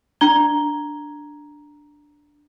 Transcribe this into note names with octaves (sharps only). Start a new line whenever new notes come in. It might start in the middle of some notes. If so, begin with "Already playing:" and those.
D4 A#5 G#6 G7